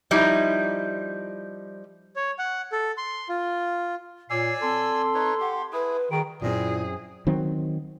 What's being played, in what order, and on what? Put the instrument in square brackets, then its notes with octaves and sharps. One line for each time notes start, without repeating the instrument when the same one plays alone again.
[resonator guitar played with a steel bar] F3 G3 D#4 E4
[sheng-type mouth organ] C#5
F#5
A4
C6
F4
[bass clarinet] A#2 [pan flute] C#5 [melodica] D5 G#5 E6 [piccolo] C7
[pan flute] C4 [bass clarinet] A4 [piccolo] C6
[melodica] D#4 B4 C#5
[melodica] G4 [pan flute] F#5
[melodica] E4 G#4 [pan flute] B4
[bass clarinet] D#3 [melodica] G3 F#4 [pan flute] G#4 [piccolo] D7
[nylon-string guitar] F#2 C4 [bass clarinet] A#2 [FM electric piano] E4 F4 [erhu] G#4
[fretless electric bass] D#3 F#3 C4